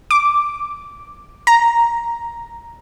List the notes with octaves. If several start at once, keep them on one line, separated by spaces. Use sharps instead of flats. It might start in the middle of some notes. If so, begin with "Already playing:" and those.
D6
A#5